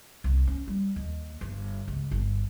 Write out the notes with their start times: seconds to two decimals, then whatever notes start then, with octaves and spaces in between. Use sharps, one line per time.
0.24 C2
0.47 C#4
0.68 G3
0.96 D#2
1.41 G1
1.88 C#2
2.11 G1